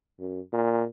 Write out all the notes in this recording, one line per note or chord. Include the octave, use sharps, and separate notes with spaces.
F#2
A#2